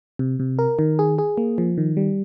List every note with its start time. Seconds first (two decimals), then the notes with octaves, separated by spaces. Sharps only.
0.19 C3
0.40 C3
0.59 A#4
0.79 D#3
0.99 G#4
1.18 G#4
1.38 A#3
1.58 F3
1.78 D#3
1.97 G3